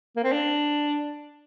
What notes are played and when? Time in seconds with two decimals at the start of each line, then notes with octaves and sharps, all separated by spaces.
0.16 A#3
0.24 C4
0.32 D4